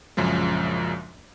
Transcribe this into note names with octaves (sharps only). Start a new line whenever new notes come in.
A#1 F#2 C#3 F3 G#3